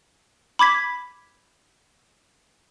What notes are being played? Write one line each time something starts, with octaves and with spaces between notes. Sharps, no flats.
B5 D6 G#6 B6